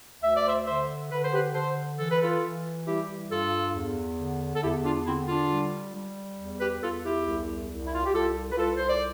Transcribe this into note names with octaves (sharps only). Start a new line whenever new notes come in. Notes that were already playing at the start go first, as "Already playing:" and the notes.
D2 E5
D5
C5 E5
D3 C5 E5
D3 B4
C5
G4 B4
D3 A4 C5
E3 A4
B4
F4 A4
E3
G3 E4 G4
G2 F4 A4
E2
D3
A4
E2 E4 G4
D4 F4
D3 C4 E4
D4 F4
G3
G3
E2
G4 B4
E2 F4 A4
E4 G4
C2
C2
E4
F4
G4
C2 F4 A4
B4
C2 F4 A4
C5
D5